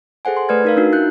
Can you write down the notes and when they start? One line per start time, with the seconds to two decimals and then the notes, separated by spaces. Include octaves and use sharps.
0.25 G#4 A4 C5 F#5 G#5
0.37 C6
0.49 A3 B4 D5 F6 G#6
0.65 D#4 A#4 F5
0.77 D4 D#4 F#4
0.93 E4 F#6 G6